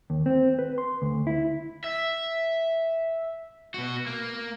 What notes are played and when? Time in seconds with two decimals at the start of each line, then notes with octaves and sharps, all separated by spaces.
0.10 D#2
0.26 C4
0.59 B4
0.78 C6
1.02 D2
1.27 E4
1.84 E5
3.74 B2 F#4
4.07 A#3